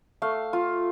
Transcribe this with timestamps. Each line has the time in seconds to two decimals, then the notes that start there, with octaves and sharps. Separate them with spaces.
0.22 A3 F5
0.53 F4